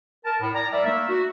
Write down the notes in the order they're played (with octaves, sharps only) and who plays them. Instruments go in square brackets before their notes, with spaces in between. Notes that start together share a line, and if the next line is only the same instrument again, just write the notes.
[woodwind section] A#4 A5
A2
D5 G#5 A#5
G3 A#4 D5 E5
A3 A#3 D#4 A#4 E5
F#4